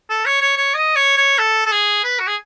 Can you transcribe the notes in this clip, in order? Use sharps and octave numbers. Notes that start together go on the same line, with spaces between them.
A4
C#5
C#5
C#5
D#5
C#5
C#5
A4
A4
G#4
B4
F#4
G#4